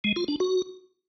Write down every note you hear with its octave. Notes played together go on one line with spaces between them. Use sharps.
G#3
F4
D4
F#4